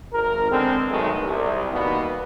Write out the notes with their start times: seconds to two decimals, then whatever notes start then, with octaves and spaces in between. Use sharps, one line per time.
0.13 G#1 A#4
0.51 D3 G#3 B3 C4
0.89 B1 D#3 F#3 G#3 A3
1.21 C2
1.72 B2 D#3 G3 A#3 B3